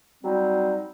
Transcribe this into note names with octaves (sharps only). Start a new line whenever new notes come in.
F#3 G3 C4 D#4